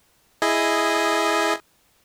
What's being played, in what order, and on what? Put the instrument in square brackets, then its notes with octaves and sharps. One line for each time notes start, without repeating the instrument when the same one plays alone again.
[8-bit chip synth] E4 G#4 D#5